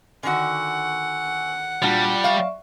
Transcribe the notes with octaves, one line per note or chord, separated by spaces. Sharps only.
D3 D#3 F#4 F#5 G#5 C#6 E6
A#2 G3 D4 F4 F#4
D5 E5 F5 C#6